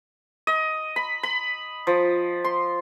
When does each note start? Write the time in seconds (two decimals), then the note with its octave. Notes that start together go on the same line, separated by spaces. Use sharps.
0.47 D#5
0.96 B5
1.23 B5
1.87 F3
2.44 C6